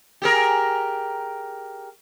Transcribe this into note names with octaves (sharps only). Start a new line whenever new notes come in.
G4 G#4 A#4